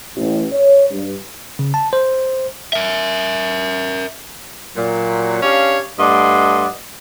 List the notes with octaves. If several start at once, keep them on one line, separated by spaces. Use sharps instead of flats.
A1
C#5
G2
C#3
A5
C5
A#4 E5
A#2 F#3
C#4 D4 G4 C#5 F5
G2 A3 D5 D#5 F#5 C6